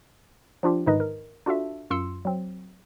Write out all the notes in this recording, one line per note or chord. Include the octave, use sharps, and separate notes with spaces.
F3 D4 F4 G4
G1 G#2 D#3 D#4 B4 D#5
A#4
D4 F4 F#4 A4 E5
F#2 F4 C6 E6 C#7
F#3 C4